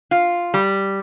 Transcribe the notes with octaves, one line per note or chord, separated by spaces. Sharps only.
F4
G3